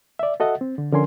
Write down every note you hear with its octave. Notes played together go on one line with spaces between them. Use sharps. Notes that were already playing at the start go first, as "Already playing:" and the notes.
D5 E5
F#4 A4 D#5 E5 F#5
C4
D3
D3 F3 C#4 A#4 G#5 C6